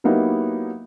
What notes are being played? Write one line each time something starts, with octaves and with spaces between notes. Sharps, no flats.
F#3 A#3 B3 D#4 E4 G4